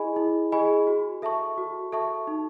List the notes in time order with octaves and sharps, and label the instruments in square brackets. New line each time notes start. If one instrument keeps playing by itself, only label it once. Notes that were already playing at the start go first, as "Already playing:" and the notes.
Already playing: [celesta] E4 G#4 D#5 G#5 B5
E4
G#4 D#5 G#5 B5
F#4
A4 E5 A5 C#6
F#4
A4 E5 A5 C#6
D#4